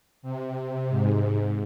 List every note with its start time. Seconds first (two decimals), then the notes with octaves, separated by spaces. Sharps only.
0.22 C3
0.90 G#2